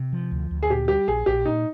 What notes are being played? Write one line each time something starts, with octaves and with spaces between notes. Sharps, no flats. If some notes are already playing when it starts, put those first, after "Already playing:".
Already playing: C3
F3
D2
D2
G#4
A#2 G4
G3 G4
A#1 G#4
A#1 G4
A#2 D#4